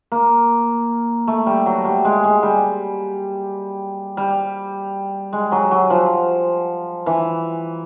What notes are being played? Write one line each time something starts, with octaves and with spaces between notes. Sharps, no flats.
A#3
A3
G3
F#3
G3
G#3
G#3
G3
G3
G#3
F#3
F#3
F3
E3